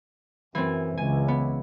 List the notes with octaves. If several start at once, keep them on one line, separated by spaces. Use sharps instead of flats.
F#2 E3 C4
C#2 G#5
B3